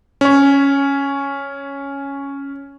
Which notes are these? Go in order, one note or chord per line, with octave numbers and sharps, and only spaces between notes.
C#4 C#5